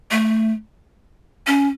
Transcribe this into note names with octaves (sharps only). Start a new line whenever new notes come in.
A3
C#4